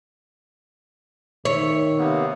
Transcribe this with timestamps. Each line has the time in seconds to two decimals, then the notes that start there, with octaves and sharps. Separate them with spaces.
1.45 D#3 C#5 E5
1.98 C3 A#3 B3